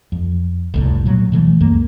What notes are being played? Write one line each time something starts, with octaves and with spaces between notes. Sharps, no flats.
F2
F1 C2 A2
A#2 F#3
B2 E3 F3 A3
C#2 F#2 A#3